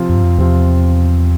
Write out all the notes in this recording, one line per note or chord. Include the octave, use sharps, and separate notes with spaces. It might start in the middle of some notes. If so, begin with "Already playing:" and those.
Already playing: C3 F3 C4 F4
F2
G2
F2
E2 C3 F3 C4 F4